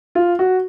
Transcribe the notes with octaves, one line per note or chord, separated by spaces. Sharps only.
F4
F#4